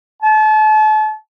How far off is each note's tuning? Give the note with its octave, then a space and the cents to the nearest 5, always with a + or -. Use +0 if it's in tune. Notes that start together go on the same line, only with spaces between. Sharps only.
A5 -35